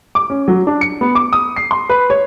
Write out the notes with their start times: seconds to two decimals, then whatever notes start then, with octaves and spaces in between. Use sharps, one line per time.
0.15 D6
0.30 C#4
0.48 F#3
0.67 D4
0.81 C#7
1.01 B3
1.15 D6
1.33 D#6
1.56 C7
1.71 C6
1.89 B4
2.10 C#5